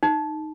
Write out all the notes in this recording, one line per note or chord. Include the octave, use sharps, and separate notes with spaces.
D#4